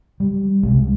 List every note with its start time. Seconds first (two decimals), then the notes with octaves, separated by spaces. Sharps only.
0.20 G3
0.63 C2 C3 G#3